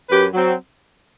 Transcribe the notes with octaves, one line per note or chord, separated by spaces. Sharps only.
F#2 G4 B4
F#3 C4